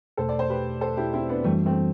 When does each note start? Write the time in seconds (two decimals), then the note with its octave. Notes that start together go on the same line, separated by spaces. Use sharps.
0.17 E2 B2 A3 A4 C5
0.29 D5
0.39 C5
0.50 G4 B4
0.81 A4 C5
0.97 E4 G4
1.13 C4 E4
1.29 B3 D4
1.44 F#2 E3 G3 A3 C4 D4 F#4
1.66 A3 C4